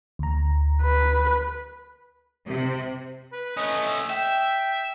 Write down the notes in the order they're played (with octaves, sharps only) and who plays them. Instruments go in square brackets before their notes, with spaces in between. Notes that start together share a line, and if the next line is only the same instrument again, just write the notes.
[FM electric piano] D2 A#5
[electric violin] B4
[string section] C3
[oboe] B4
[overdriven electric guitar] A3 C#4 [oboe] D#5
[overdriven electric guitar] E5 [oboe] G5